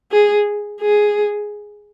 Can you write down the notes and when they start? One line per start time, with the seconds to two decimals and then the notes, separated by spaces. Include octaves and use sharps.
0.12 G#4
0.81 G#4